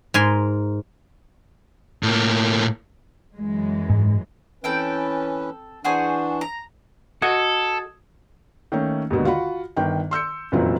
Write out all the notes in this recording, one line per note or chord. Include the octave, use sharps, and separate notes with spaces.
G#2 A#4 G#5 C6
A2 A#3
F#2 E3 G#3
G#2
E3 C4 C#4 A4 B4 G5
E3 D4 F#4 G#4 C5
A#5
F#4 A4 D#5 F#5 D#6 G#6
D#3 A3 A#3 C#4
D#2 G#2 B2 D3
F4 F#4 F#5 B5
G1 D#3 G5
C6 E6 G6 C#7
F1 F#2 A#2 E3 C4 F4